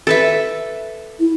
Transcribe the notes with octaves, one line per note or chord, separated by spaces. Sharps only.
A4 B4 E5
E4